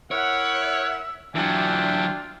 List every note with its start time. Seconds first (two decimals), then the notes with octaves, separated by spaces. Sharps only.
0.11 E4 A#4 C#5 E5 F#5
1.35 E3 F#3 D4 F4 E5 G5